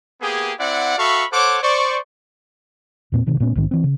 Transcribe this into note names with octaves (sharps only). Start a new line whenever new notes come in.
A#3 B3 G4 G#4
C4 E4 D5 F#5
F#4 A4 E5 F5 B5 C#6
A4 C5 C#5 F#5 D6
C5 D5 C#6
E2 A#2 C4
D1 D2 C3 D#3
A#2 A3 B3 C#4
A#1 G#2 D#3 C4
E3 C4
C#3